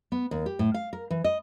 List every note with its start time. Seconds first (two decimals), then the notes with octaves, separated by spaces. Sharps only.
0.12 B3
0.31 D#2
0.46 G4
0.59 A2
0.74 F5
0.93 A#4
1.10 E3
1.24 D#5